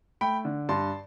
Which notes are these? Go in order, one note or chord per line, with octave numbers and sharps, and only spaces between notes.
A3 G5 B5
D3
G2 A5 C6